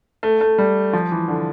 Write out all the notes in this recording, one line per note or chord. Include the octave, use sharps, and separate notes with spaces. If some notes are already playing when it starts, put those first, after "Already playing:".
A3
A3
G3
F3
E3
D3